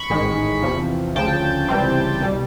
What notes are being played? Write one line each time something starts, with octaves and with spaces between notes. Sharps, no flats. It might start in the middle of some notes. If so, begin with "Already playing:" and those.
Already playing: B5 C#6
A1 G#2 D#3 G#3
E2 C3 F3
D2 C#3 F3 G5 A5
C#2 C3 E3 G3 C4
C2 B2 G3